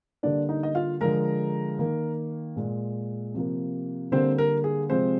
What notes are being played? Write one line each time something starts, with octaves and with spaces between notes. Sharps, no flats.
D3 G3 A#3 D4 D5
D#4 D#5
D#5
F4 F5
D3 F3 G#3 A#4 A#5
D#3 A#3
A#2 G#3
C3 F3 A#3
D3 G3 A#3 C4 C5
A#4
G#4
C3 F3 G#3 C4 C5